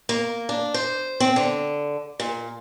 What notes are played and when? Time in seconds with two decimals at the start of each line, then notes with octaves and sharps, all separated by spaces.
0.09 A#3
0.49 D4
0.74 C5
1.20 C4
1.36 D3
2.20 A#2